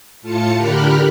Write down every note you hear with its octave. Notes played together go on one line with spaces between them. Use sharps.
A2 F4 A5 C#7
D3 G4 A#4 B5 F6 F#6